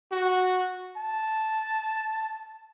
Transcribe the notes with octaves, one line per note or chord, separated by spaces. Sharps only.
F#4
A5